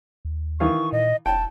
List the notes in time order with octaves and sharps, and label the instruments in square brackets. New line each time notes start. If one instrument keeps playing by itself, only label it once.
[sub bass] D#2
[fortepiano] D#3 E3 F5 [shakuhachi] C#6
[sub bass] A#2 [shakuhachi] D#5
[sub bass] E1 [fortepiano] G5 [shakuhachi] A5